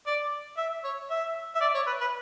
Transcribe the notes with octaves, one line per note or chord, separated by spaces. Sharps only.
D5
E5
C#5
E5
E5
D5
C#5
B4
B4